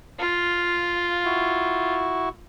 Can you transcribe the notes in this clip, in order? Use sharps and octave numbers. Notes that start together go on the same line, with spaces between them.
F4 F5
E4 F#4